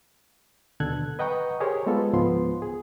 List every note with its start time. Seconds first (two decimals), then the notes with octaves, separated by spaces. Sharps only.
0.80 D#2 B2 D3 A4 F#6 G#6
1.19 B4 D#5 F#5 G5 A#5 C#6
1.60 G4 G#4 A#4 C5 C#5
1.86 G#3 B3 F4 A4
2.13 C#2 G#2 F3 B3 C6
2.62 G#4